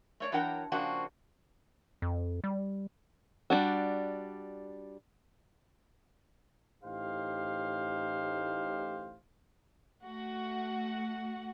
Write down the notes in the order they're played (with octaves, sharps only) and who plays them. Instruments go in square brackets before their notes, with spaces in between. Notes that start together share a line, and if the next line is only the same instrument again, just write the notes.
[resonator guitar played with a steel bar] A3 C#5 D5
E3 F#3 D4 A#4 F#5 G5
C#3 F3 A#3 C4 D4 F#4
[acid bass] F2
G3
[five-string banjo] G3 D4 F#4
[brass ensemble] A1 A2 D#4 G4 C5 F5
[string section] A3 F#4 F#5